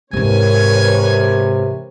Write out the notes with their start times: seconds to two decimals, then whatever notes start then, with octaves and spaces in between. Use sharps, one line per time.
0.13 G#2 C3 E3 A#4 B4 C#5 G#5